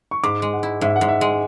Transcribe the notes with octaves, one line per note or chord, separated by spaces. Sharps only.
C#6
G#2 D6
G#3
F#5
E4
G#2 E5
F#5
G#2
E5
G#3